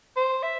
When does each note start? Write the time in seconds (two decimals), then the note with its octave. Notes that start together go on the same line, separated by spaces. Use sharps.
0.16 C5
0.43 E5